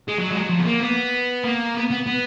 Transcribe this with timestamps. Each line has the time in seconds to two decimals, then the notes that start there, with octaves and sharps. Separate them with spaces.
0.08 G#3
0.18 F#3
0.31 G#3
0.40 F#3
0.49 F3
0.59 B3
0.65 A#3
0.80 B3
1.44 A#3
1.74 B3
1.90 B3
2.06 B3